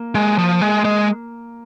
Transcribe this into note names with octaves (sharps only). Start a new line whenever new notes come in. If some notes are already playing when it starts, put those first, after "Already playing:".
Already playing: A#3
G#3
F3
G#3
G#3